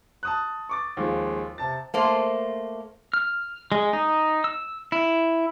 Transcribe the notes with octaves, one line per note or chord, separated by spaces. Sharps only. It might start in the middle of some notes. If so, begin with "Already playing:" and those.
A5 D#6 F#6
C#6 D6 A6
D#2 F3 G#3
C3 A5 A6
A3 A#3 C5
F6
G#3
D#4
E6
E4